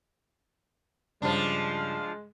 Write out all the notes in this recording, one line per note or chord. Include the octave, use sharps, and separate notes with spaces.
G2 C#3 F3 G#3 D4